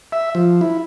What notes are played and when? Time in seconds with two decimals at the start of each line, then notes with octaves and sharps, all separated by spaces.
0.12 E5
0.35 F3
0.61 E4